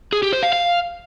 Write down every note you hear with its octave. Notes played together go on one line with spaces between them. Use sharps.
G#4
G4
C5
F5
F5